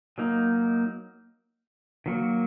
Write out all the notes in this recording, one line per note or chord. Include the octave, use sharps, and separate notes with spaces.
F#3 A#3 D#4
D#3 F#3 A#3